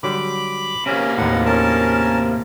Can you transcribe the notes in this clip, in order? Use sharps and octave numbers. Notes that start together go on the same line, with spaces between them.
D3 F#3 G3 B5 D6
C3 A#3 C#4
D#2 A2 F#5
C#4 A#4 A5